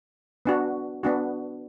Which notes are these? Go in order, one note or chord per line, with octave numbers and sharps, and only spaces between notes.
B3 D4 F#4
B3 D4 F#4